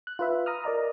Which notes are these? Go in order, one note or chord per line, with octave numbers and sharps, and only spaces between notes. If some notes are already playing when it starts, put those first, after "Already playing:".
F#6
F4 B4 E5
A#5 D#6 F6
A#4 D5 D#5 A#5